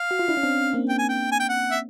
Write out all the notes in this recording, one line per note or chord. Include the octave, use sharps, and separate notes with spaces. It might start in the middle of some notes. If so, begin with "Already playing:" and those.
Already playing: F5
F#4
F4
D4 E4
C#4
C4 D4
A#3 C4
G5
G#5
G5
G#5
G5
F#5
E5